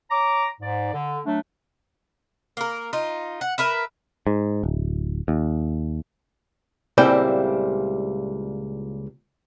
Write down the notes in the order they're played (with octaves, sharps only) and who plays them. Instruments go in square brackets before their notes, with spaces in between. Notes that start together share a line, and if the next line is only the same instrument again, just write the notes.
[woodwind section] C#5 A#5 D6
G#2 D5
D3
F#3 A3 D4
[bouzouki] A#3 A#4
D#4 F4
F#5
A#4 B4 E5
[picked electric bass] G#2
D1
D#2
[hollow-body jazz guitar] C#2 A#2 G3 C4 E4 G5